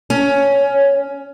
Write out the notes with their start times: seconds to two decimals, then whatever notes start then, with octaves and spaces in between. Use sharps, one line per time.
0.10 C#4